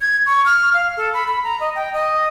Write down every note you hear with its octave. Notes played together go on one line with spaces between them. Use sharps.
G#6
C#6
F6
F5
A4
B5
B5
A#5
D#5
G5
D#5